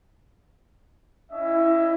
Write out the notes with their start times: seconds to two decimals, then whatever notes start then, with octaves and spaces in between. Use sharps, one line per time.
1.32 C#4 E4 D#5 E5